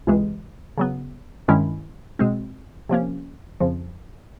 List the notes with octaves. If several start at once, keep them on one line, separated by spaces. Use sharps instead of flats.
C#2 C3 E3 G#3
C#3 F#3 B3
G2 D#3 G#3 C#4 E4
B2 G#3 C4
C3 F3 A#3 C#4
F2 C#3 F3